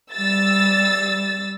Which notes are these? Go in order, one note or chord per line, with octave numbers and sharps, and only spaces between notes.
G3 E6 A6